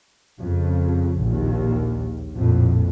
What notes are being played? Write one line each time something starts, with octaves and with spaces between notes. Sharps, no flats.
F2 C#3
A#1 D#2
A#1 F2 A2